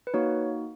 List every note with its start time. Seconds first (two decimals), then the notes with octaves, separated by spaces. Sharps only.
0.07 B4
0.14 A#3 D#4 F#4 C#5